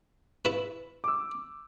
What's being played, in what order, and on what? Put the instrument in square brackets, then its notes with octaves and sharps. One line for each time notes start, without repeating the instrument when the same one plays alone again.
[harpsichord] E4 B4
[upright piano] D6 E6